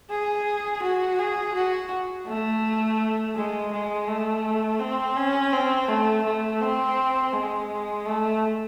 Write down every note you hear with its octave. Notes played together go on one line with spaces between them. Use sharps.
G#4
F#4
G#4
F#4
A3
G#3
G#3
A3
C4
C#4
C4
A3
A3
C4
G#3
A3